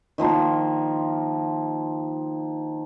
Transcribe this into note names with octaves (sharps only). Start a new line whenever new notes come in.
D#3 F3 A#3 C6